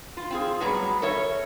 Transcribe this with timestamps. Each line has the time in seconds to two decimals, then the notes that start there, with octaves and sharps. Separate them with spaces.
0.17 F4
0.31 C4 F4 G#4
0.60 A2 F#3 G3 B3 G#4 A#5
1.02 A4 A#4 C#5 E5